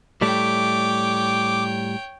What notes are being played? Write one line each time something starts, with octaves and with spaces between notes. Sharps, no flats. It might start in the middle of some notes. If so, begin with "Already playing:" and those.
A2 G3 A3 C#5 G5 D6